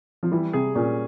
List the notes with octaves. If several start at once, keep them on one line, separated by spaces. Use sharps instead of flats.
F3
E3 G3
C3 G#4
A#2 C#4